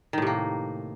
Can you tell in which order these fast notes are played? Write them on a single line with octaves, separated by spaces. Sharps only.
D#3 A2 C3 A#3